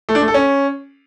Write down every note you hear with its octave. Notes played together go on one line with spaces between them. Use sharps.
A3
D4
A3
A4
C#4